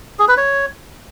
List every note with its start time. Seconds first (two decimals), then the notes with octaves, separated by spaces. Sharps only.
0.19 G#4
0.28 B4
0.37 C#5